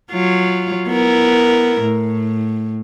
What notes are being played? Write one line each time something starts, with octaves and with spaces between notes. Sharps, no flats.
F#3 F4
B3 E4 A#4
A2